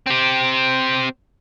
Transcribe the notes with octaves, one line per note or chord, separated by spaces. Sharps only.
C4 G4